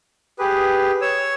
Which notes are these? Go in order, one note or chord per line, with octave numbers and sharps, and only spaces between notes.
G4 G#4 B4
C#5 E6